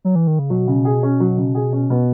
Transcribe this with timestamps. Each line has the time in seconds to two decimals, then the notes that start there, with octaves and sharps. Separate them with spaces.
0.05 F#3
0.15 E3
0.27 D#3
0.39 C#3
0.50 B2 F#3
0.68 C#3
0.85 G#4
1.03 C#4
1.20 F#3
1.37 C#3
1.55 G#4
1.73 C#4
1.90 B2 B3